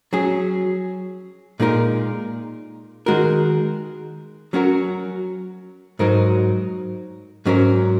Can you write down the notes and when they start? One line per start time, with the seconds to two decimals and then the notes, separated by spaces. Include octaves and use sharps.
0.13 F#3 C#4 G#4
1.60 A#2 G#3 D#4 A#4
3.06 D#3 G#3 F#4 A#4
4.53 F#3 C#4 F#4 A#4
5.99 G#2 F#3 D#4 A#4
7.45 G#2 F#3 C#4 A#4